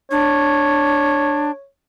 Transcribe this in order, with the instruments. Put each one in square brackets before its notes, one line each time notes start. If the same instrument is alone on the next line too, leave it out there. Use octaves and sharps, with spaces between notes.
[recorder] D4 [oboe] C#5